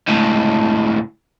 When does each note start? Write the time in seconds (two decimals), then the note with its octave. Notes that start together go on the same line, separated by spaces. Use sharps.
0.08 C#2 A2